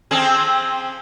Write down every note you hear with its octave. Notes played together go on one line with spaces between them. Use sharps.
F3 C4 G#4